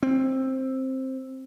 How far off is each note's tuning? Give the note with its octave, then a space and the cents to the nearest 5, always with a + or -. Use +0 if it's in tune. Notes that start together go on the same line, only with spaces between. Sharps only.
C4 +10